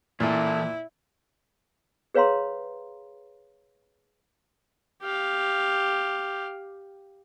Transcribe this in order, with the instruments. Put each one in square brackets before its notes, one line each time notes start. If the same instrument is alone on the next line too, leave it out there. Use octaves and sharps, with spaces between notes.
[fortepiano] A#2 [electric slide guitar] E3 A4 [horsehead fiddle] E4
[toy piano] G#4 B4 C#5 F5 A#5 C6
[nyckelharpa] G4 F5